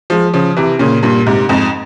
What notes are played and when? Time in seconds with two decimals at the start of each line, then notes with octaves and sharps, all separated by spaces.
0.10 F3 G#3
0.33 C#3 F3
0.57 C3 E3
0.79 A#2 C#3
1.03 G2 A#2
1.26 G#2 C3
1.49 F2 G#2